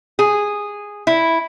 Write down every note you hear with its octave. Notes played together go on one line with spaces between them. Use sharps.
G#4
E4